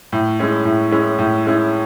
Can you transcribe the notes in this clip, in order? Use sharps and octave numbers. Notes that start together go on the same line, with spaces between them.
A2
G#3 C#4 E4
A2
G#3 C#4 E4
A2
G#3 C#4 E4